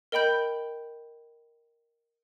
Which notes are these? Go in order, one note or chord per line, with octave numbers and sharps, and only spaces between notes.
A#4 D#5 G5 B5 G6